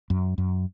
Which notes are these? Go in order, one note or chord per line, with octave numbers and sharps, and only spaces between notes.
F#2
F#2